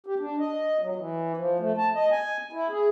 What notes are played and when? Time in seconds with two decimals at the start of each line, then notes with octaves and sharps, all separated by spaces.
0.06 G4
0.19 D4
0.39 D#5
0.81 F#3
0.96 E3
1.37 F3
1.59 A3
1.77 A5
1.95 D#5
2.11 G#5
2.53 E4
2.69 G#4